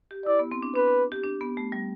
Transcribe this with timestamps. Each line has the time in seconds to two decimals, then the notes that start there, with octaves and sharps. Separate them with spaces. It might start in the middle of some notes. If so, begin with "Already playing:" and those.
0.11 G4
0.26 E4 D5
0.39 B3
0.51 C4
0.62 D4
0.76 D4 B4
0.88 D4
1.12 G4
1.24 D4
1.41 B3
1.57 A3
1.72 G3